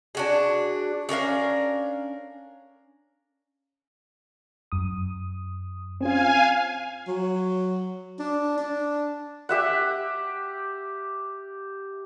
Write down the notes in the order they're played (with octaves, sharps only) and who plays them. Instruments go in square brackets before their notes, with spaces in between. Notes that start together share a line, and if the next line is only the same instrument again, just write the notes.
[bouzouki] D4 F#4 G#4
C#4 D4 A#4 F5
[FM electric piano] F#2 D#6
[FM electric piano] C4 C#4 F4 [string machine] F5 G#5
[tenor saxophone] F#3
D4
D4
[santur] G4 E5 F#5